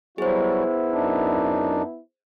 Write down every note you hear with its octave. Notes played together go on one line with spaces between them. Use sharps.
F#3 G3 B3 E4 F#4 G#4 C5
F#2 D4 D#4